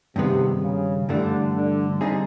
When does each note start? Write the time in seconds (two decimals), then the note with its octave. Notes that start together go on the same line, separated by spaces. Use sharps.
0.16 G2 C3 D#3 G#3 B3
0.62 C#3
1.09 G2 D3 E3 A3 D4
1.55 D3
2.01 D3 G3 C4 D#4 G#4